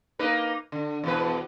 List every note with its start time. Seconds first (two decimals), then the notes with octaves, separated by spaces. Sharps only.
0.19 A#3 D#4 B4
0.72 D3
1.04 E2 B2 B4